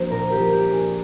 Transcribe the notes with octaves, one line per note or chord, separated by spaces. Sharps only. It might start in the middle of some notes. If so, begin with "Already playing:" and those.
Already playing: F3 A#3 D4 F#4 C5
A#2 A#4
G4
F3
G4
D4
G#4